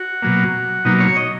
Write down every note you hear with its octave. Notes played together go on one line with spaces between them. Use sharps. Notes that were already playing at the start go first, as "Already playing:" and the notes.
Already playing: F#4
B2 F#3 A#3
B2 F#3 A#3 D#4
C#5
D#5